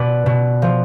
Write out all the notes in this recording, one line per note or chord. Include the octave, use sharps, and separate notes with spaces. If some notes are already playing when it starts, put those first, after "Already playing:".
Already playing: B2 B4 D5
B2
F3